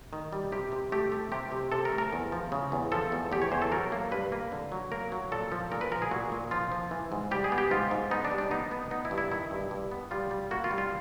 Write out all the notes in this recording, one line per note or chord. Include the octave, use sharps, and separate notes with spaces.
D#3
G3
C3 G4
C3
A3 G4
A3
C3 G4
C3
C3 A4
A#4
A3
A#4
E2
F3
C#3
E2
F3 A4
E2
E2 G4
C#5
E2 C5
A4
F#3 A#4
A#3
G2 B4
A#3
D3
F#3
A#3 A#4
F#3
A#2 A4
F3
A#2 A#4
B4
F3 A#4
G#4
A#2 F#4
A#2
F3 F4
F3
E3
G#2
G3 G4
G#4
B3
G4
G#2 F4
G#2
B3 D#4
D4
G3
D4
B3 D#4
B3
B3 D#4
E4
G2
E4
D#3 E4
G2
G2
B3
G3 F4
G3
A#3 F#4
F4
G3
F4